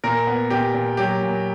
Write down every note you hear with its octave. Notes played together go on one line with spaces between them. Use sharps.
A#2 A#4
B3
A#2 G4
A#2
F#3 G4
A#2